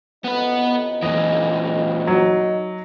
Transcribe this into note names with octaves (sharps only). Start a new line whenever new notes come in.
A1 F2 B3 D#4 B4
A#2 E3 D#5
F#3 D#4